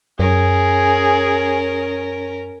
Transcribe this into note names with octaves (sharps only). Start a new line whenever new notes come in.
F#2 C#4 G#4 A#4